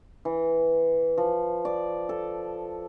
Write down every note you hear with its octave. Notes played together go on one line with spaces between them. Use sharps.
E3
F3
D5
A4